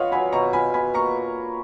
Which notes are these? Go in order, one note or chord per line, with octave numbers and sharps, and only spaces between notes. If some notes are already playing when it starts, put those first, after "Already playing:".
Already playing: B3 F4 B4 C#5 D#5 F5 F#5
F#3 G#5 B5
B2 A#5 C#6
F4 G#5 B5
B2 G#5 B5
A#3 A#5 C#6